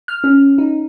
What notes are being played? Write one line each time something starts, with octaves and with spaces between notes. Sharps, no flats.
F6
C#4
D#4